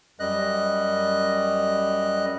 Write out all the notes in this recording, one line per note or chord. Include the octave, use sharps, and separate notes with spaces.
F#2 G3 D#5 F#6